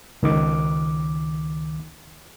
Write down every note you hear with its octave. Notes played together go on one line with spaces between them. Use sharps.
C#2 D#3 D6